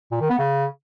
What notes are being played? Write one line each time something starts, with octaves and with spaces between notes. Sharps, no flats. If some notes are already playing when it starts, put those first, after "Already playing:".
A#2
D#3
B3
C#3